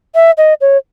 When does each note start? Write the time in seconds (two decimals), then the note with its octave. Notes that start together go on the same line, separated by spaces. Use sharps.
0.15 E5
0.38 D#5
0.61 C#5